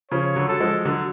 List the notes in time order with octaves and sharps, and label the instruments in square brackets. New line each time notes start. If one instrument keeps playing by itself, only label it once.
[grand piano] C#3 F3 [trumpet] C#5
[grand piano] D3 F#3
[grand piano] F#3 [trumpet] A4
[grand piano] F3 G#3
D3 F#3